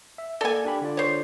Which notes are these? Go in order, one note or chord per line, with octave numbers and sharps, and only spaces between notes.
E5
A#3 A4 D5 G#5
D4 G4 B5
D3 F4 D5
C5 C#5